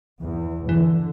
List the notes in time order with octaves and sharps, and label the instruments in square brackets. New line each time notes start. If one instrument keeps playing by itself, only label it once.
[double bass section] E2
[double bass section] D3 [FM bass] E3